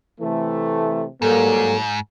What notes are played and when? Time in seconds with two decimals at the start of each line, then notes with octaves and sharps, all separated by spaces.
0.21 C3 E3 A3
1.22 G#2 F#3 G3 A#3 A4